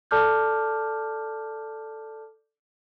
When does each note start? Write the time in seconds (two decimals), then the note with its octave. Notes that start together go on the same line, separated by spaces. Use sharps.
0.11 A4 D5 A5 D6 F6 G6